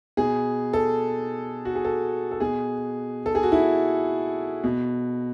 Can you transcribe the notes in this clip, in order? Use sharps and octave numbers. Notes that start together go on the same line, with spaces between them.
B2 G#4
A4
F#4
G#4
A4
A4
B2 G#4
A4
G#4
F#4
E4
B2